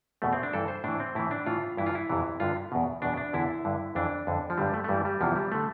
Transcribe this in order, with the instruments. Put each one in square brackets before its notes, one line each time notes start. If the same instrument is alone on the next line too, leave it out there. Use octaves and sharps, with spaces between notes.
[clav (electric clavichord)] E2 B2 A3
C4
D4
G2 E3 A4
C5
A2 E3 D4
C4
A2 E3 E4
D4
A2 E3 F4
G2 E3 E4
F4
E4
F2 C3 E3
G2 D3 F4
E2 B2
E2 B2 D4
D4
E2 D3 E4
G2 D3
F2 E3 D4
F2 D3
F3
G2 D3 G3
A3
A3
G2 E3 G3
G3
E2 C3 E3 F3
G3
D3 A3